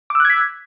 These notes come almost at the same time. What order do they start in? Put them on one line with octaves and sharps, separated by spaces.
D6 E6 F#6 G#6 B6